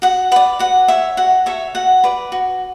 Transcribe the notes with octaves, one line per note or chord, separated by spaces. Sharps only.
F#4 F#5
B4 D5 F#5
F#4 F#5
C#5 E5
F#4 F#5
A4 C#5 E5
F#4 F#5
B4 D5
F#4